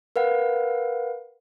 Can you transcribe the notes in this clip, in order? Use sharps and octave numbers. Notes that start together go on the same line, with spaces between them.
A#4 B4 F5 F#5